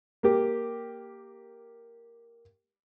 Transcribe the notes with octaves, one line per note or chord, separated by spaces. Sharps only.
A#3 G4